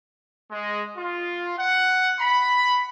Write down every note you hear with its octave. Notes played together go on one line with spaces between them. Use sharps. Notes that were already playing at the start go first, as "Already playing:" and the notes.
G#3
F4
F#5
B5